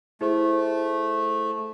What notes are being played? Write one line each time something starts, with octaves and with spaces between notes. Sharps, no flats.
A3 E4 G#4 C5